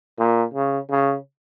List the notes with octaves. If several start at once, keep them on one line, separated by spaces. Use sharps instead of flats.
A#2
C#3
C#3